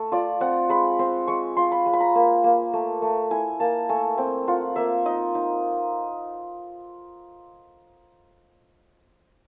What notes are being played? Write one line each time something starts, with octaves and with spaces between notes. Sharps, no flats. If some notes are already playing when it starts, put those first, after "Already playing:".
Already playing: A3
F4 D5
C4 F#5
G#3 B5
C4 C6
G#3 C#6
F4 C6
B5
G#3
B5
A#5
A#3 B5
A#3
A3
A3
E4 G#5
A#3 A5
A3 G#5
C4 G5
F4 F#5
A#3 E5
D#4 D#5
D#4